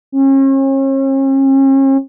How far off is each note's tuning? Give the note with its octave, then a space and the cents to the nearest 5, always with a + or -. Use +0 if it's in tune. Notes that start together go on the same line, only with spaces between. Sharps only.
C#4 -40